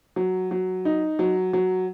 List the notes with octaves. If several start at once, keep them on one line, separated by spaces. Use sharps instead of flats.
F#3
F#3
D#4
F#3
F#3